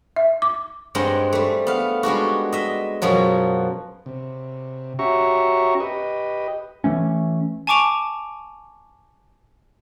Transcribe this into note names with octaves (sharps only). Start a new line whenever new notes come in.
E5
D6
G2 G#3 C4 D#5 F#5
G3 A3
B3 F5
G3 G#3 D4 F#4
D#5 E5
F#2 B2 F3 F#3
C3
C#4 F#4 G4 E5 A#5 C#6
G4 B4 D#5
E3 A3 C#4
G#5 A5 C#6 D6 D7 F7